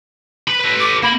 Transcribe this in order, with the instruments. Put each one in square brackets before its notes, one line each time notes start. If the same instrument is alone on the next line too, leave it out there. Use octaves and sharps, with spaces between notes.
[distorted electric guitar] B4 B5
A4 B4
[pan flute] D6
[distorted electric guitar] A#3 [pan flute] B5